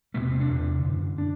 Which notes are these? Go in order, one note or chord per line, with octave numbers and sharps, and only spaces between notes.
E2 C3 A3
B3
C4
D4
E2 C3
F#2 D3
D4